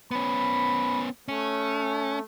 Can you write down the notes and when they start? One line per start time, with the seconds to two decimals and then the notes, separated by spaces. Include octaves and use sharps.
0.11 B3 C#4 B5
1.28 A3 C#4